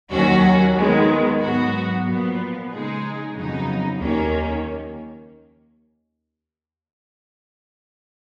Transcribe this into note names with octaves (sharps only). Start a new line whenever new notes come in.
D#2 D#3 F#3 C#4 F#4
D#3 G#3 B3
G#2 F#3 B3 F#4
A#2 F3 B3
C#3 G#3 D#4 G#4
F2 C#3 F#3 B3 D#4
D#2 D#3 A#3 C#4